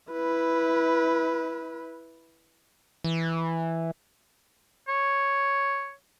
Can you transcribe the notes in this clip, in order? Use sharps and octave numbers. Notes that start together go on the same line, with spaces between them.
E4 B4
E3
C#5